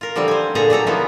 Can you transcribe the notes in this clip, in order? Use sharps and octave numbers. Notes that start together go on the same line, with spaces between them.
F4 A#4
D3 F3 G3 C4
C5 G#5
A#2 D3 G#4 A4 A#5
F#3 G4 A4 A#5
C#3 E3 F3 A#3 B3